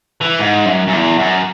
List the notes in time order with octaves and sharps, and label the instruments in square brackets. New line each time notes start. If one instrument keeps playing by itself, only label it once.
[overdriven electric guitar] E3
G#2
F#2
F#2
E2
F#2